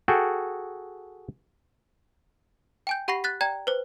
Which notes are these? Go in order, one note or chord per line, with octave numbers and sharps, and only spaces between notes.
F#4 G#4 A4 G5
G5 G#5 G6
G4 F#5 B5 C#6 A#6 C7
F#6 A6 B6
D5 G5 A#5 G#6
B4 C5